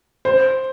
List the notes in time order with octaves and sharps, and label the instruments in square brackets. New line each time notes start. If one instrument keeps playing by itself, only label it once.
[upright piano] C5